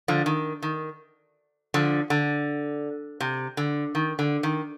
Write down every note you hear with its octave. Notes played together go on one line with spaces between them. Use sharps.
D3 F3
D#3
D#3
D3 F3
D3
C3
D3
D#3
D3
D#3